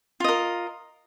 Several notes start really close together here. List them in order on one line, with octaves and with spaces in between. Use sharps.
F4 D#5 A#4